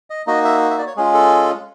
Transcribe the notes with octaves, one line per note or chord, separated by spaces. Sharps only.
D#5
A#3 D#4 F#4 D#5
E5
E5
D5
C#5
G#3 C#4 F4 G#4
A4